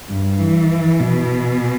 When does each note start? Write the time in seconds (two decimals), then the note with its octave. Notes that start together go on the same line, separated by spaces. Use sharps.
0.10 G2
0.40 E3
1.00 B2